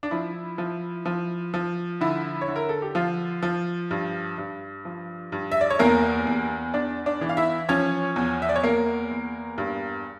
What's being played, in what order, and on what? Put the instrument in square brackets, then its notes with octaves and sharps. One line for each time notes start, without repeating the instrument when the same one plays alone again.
[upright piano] D4
F3 E4
F3
F3
F3
D3 E4
C#5
D3
A#4
A4
G4
F3 F4
F3
G2
G2
F3
G2
E5
D5
C#5
E2 A#3 A#4
E2
E2 D4 D5
D4 D5
E3
F5
E4 E5
F3 C#4 C#5
E2
E5
D5
C#5
E2 A#3 A#4
E2
G2